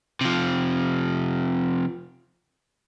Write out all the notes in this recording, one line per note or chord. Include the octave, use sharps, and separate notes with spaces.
C3 F3